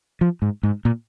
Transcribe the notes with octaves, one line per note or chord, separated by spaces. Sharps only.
F3
G#2
G#2
A#2